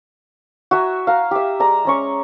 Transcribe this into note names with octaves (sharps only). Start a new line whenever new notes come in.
F#4 E5 G#5 A#5
F5 A#5
G4 E5
G#3 D5 A#5
G#3 C#4 C#6